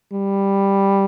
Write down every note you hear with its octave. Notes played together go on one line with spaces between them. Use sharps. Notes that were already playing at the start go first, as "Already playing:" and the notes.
G3